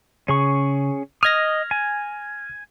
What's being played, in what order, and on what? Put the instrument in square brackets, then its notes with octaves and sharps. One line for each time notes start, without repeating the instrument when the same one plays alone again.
[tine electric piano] C#3 [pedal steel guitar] C#4 G#4 C#6
[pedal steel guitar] D#5 D#6 [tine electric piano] F6 G#6 A#6
[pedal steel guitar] G#5